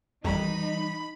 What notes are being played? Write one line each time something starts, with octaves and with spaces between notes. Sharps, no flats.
G#1 F2 E3 G3 D#4 B5